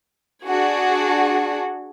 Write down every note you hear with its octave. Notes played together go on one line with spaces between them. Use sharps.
D4 F#4 G#4